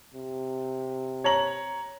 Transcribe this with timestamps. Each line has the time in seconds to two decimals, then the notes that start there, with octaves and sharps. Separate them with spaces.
0.14 C3
1.24 C#5 A#5 F#7